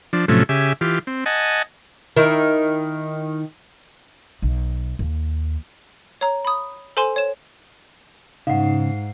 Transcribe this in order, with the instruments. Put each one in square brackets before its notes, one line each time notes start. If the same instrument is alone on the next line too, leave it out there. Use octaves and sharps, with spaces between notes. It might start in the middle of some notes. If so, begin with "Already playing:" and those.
[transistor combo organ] F3 D4
A2 C3 F3 F#3 A3 C#4
C#3 G4 E5 G#5
E3 F4 G4
C4
D#5 F#5 G#5 A5
[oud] D#3 E4
[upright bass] B1
D#2
[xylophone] C#5 A#5
B5 D#6
A4 C5 G#5 C6 E7
C#5 E7
[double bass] G#2 [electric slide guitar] C#3 [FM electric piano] D#4 C7 [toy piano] F5 F#5